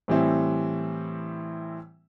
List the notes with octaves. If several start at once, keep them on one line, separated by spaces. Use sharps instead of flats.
A2 E3 G3 C4 E4